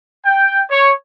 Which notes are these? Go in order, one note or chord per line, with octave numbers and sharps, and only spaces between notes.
G5
C#5